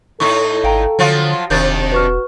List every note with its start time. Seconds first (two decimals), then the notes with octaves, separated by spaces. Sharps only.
0.20 A2 D#4 E4 A4 C#6
0.64 G#1 F5 G5 A#5
0.99 D3 F3 F#3 F4
1.50 E1 C3 D#3 D4 G6 A6
1.92 F#4 B4 C#6 F6